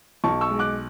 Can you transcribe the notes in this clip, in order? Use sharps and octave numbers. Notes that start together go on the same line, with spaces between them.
B1 A5 C#6
C#6 E6
G#3
D6 F#6